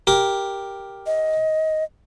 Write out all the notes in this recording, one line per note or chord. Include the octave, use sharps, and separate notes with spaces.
G4 A#4
D#5